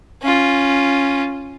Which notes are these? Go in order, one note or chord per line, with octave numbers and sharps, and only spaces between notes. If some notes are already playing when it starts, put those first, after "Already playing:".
C#4 F4